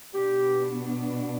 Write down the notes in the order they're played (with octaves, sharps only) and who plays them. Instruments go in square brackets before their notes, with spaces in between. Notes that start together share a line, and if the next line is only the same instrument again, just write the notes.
[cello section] B2 B3 D4 [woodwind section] G4